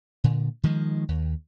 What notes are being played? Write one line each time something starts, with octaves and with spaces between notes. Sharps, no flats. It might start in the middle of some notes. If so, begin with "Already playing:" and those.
A#2 D3
D#3 F3 G#3
D#2